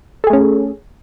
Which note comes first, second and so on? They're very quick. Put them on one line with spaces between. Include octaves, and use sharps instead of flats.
A4 G#4 A3 C#4